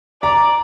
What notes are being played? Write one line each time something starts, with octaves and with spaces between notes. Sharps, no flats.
D5 A#5